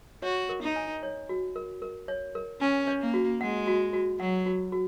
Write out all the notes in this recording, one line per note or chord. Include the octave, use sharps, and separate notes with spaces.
F#4 C#5
A#4
D#4
G#5
C#5
F#4
A#4
A#4
C#5
A#4
C#4 G#5
C#5
A#3
F#4
G#3 F#5
F#4
F#4
F#3 F#5
F#4
F#4